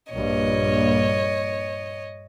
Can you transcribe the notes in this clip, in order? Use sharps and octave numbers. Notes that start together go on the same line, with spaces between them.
A#1 G2 A#3 C#5 D#5